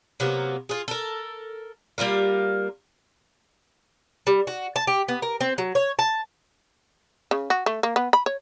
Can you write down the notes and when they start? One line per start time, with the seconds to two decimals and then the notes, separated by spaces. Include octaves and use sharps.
0.20 C3 F#3 A#3 B3
0.69 F4 G#4
0.88 A4 A#4
1.98 G3 A#3 F4 A#4
4.27 G3
4.47 F#4
4.76 A5
4.87 G4
5.08 B3
5.22 A#4
5.41 C4
5.58 F#3
5.75 C#5
5.99 A5
7.31 C#3
7.50 F#4
7.66 A3
7.83 A#3
7.96 B3
8.13 B5
8.26 C#5